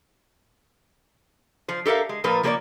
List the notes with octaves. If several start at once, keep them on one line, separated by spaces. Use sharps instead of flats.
F3 C5
G4 A4 A#4 E5 F5
G#3
A#2 F3 A#4 B4
F3 A#3 G#4 B4 C#5 D5